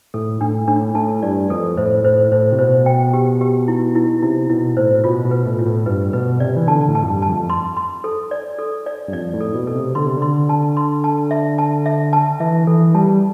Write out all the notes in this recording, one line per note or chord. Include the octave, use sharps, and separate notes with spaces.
A2 A4
A2 D4
A2 D4
A2 A5
G2 D5
F2 A4
A2 C5
A2 C5
A2 C5
C3
B2 C5
G5
G4
G4
E4
E4
C3 E4
B2 E4
A2 C5
B2 F4
B2
B4
A2
F4
A2
G2 B4
B2 B4
C3 D5
E3
D3 A5
A2
A5
F2
G2
A5
F2
C6
C6
A4
D5
A4
D5
G2
F2 D5
A2
A4
B2
A4
C3
D3 C6
C3
D3
C6
A5
C6
A5
E5
A5
E5
A5
E3 E5
E3 A4
G3 A5